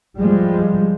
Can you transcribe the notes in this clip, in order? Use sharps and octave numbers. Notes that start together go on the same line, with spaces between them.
F3 G3 G#3